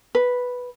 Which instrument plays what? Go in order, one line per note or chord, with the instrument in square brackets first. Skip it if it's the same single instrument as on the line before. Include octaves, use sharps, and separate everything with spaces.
[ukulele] B4